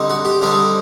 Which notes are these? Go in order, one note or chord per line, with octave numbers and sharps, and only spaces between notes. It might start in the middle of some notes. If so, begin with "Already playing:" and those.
Already playing: D3 G3 C4 D#4
F#4
G4
D3 G3 C4 D#4